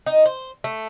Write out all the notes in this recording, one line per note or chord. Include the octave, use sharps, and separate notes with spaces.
D#4
C5
A3